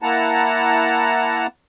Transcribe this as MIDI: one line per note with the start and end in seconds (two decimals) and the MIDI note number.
0.02 1.47 58
0.02 1.47 64
0.02 1.47 78
0.02 1.47 81
0.02 1.47 82